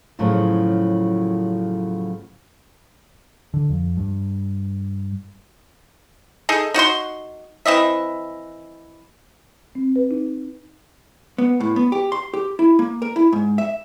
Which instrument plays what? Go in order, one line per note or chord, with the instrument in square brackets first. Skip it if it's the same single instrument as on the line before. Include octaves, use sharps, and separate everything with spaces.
[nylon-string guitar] F#2 A2 C#3 F3 F#3
[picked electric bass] D3
F2
G2
[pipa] D#4 G#4 A4
D#4 F#4 C#5 C6
E3 C4 D#5 E5
[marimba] C4
B4
D#4
[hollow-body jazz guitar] B3
A2
B3
G4
C6
G4
E4
A#3
A#4
E4
G#2
E5